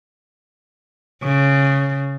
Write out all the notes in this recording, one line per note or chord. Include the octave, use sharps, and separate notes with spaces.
C#3